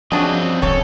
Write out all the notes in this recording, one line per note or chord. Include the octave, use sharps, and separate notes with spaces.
C#3 F3 C4 D4 F#4 D#5
D#1 C2 G2 C#3 A4 C#5